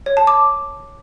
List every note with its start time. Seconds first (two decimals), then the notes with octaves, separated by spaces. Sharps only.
0.06 C#5
0.17 A5
0.27 D6